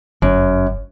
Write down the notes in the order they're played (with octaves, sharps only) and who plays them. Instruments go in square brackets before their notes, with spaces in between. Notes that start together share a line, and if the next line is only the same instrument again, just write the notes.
[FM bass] G1 [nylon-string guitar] F#2